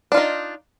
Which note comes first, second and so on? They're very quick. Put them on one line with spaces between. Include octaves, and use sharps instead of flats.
D4 F4 D#4